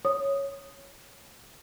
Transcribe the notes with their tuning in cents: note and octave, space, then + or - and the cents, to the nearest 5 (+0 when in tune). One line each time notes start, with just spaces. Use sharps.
C#5 +0 D#6 -5